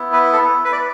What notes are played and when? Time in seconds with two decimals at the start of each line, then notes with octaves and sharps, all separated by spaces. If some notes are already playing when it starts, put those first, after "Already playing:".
Already playing: B3 E4
0.13 B4
0.33 A4
0.65 B4
0.72 D5